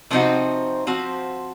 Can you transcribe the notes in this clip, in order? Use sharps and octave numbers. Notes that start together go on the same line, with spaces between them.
C3 F3 C4 D#4 F#4
F3 C4 F#4